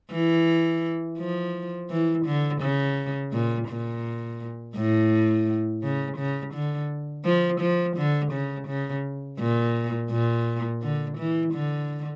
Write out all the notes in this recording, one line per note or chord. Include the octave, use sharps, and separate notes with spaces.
E3
F3
E3
D3
C#3
A#2
A#2
A2
C#3
C#3
D3
F3
F3
D3
C#3
C#3
A#2
A#2
D3
E3
D3